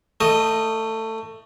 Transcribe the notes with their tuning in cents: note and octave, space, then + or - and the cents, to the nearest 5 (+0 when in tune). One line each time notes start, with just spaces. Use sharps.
A3 +20 D#5 +0